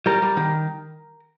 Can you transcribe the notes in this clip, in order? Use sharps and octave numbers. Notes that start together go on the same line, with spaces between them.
G3 A#4
G3
D#3